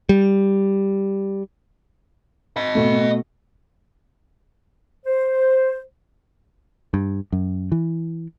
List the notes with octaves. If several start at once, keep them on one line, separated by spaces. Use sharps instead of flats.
G3
D#5 B5
B2 A3
C5
G2
F#2
E3